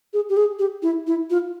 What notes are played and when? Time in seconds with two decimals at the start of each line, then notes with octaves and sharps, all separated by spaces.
0.13 G#4
0.29 G4
0.37 G#4
0.59 G4
0.83 E4
1.07 E4
1.30 F4